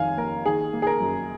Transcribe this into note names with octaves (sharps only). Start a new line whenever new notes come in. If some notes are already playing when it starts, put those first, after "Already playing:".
Already playing: F2 D#3 C#4 F5 G#5
A#3 A#4
D#3 G#4
A#3
G#4
A#4
F#2